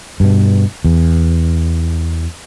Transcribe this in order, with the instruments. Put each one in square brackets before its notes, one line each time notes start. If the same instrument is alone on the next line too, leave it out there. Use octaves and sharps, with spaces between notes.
[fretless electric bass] G2 B2
E2